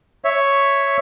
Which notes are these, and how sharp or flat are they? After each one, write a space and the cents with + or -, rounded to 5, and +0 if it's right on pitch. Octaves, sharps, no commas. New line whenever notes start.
C#5 +0 E5 +0